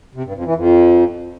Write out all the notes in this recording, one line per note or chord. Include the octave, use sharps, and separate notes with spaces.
C3
G2
F2
E3
F2